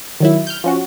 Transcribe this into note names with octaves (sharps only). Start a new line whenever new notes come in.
D#3 F#3 E4
F6 G6
F3 C#4 F#4